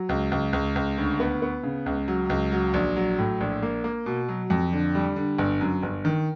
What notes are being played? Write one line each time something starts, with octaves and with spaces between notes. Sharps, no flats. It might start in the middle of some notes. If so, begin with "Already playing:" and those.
Already playing: F#3
C#2
C#2
C#2
C#2
D2
B3
B3
C#3
C#2
F#3
C#2
F#3
A#1
F#3
A2
A#1
A#3
A#3
B2
F#3
F2
D3
G3
D3
G1
F#2
G1
D#3